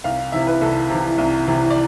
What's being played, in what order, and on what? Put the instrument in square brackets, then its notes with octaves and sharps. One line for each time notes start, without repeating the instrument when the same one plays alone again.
[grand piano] C2 F5
C3 E3 E5
B4
C2 A4
C3 E3
C2
C3 E3
D5